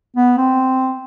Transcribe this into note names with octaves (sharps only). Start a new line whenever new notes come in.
B3
C4